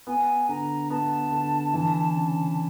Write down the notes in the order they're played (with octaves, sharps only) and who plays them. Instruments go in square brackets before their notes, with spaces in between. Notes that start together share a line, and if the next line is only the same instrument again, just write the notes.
[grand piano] B3 [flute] G#5
[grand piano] D3 [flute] A#5
[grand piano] B3 [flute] A5
[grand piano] D3
E3
C#3